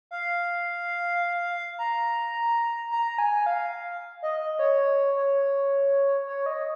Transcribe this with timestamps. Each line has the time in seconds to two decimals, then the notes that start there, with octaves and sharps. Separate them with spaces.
0.11 F5
1.79 A#5
2.91 A#5
3.18 G#5
3.46 F5
4.22 D#5
4.40 D#5
4.59 C#5
5.16 C#5
6.27 C#5
6.46 D#5